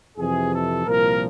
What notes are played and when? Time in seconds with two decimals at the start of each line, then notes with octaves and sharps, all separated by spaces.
0.18 F2 C3 E3 G#4
0.52 A4
0.86 C2 A#2 F3 A#4